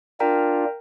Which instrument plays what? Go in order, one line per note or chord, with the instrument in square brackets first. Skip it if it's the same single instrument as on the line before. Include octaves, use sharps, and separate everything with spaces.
[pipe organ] D4 F4 [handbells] A#4 G5 A#5